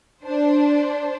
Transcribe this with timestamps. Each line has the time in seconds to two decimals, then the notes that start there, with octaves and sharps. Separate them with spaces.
0.23 D4 C5